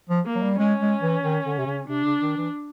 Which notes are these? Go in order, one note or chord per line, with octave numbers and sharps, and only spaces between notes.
F3
A#3
F#3
G3
G#3 C#4
G#3
E3
D#3
D3
C3
C#3
C3 D4
C#3
D#3
E3